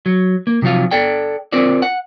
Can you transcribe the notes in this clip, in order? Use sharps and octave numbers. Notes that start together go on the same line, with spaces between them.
F#3
A#3
C3 F3 F#3 F4 F5
A4 D5 G5
C4 F4 A#4 C5 D5
F#5